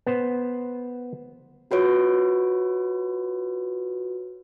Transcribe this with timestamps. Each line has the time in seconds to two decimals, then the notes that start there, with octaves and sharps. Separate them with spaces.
0.07 B3 C5
1.71 F4 F#4 B4 C#5